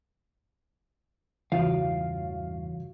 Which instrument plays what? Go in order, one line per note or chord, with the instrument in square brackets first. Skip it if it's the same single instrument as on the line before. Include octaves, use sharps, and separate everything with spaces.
[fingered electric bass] A1 E2 G2 [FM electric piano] C#3 E3 [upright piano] F4 F#4 [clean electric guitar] F5